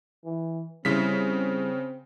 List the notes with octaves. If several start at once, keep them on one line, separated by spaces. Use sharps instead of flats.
E3
C#3 G3 C4 E4 C5 B6